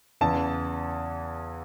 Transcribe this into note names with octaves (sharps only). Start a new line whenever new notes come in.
E2 C#3 E3 A5